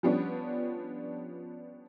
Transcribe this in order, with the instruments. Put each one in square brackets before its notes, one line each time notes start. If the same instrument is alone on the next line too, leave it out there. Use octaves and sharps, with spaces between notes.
[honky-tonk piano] F3 G3 B3 C#4 D4